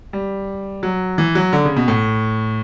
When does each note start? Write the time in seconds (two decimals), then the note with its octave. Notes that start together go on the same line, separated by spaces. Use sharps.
0.13 G3
0.83 F#3
1.18 E3
1.35 F#3
1.53 D3
1.65 C#3
1.76 B2
1.88 A2